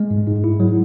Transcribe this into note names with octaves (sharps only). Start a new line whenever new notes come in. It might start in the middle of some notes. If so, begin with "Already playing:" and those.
Already playing: G#3
G#2
G#2
E4
F#3